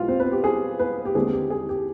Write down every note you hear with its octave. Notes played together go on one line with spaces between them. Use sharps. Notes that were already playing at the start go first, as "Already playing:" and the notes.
Already playing: B1 B2 G#3 B3 F4 G4 F5
C4 C5
B3 B4
G4
G#4
B3 B4
G4
D#2 D3 G#3 C4 G#4
G4
G#4
G4